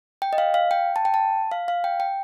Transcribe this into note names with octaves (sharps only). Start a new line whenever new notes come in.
G5
D#5
F5
F5
G5
A5
G5
A5
F5
F5
G5
G5